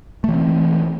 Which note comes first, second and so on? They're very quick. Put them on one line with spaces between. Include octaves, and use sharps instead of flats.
A3 E3 C4